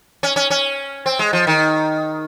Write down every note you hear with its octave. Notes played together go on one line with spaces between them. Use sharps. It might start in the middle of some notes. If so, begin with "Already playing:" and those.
C#4
C#4
C#4
C4
G#3
F3
D#3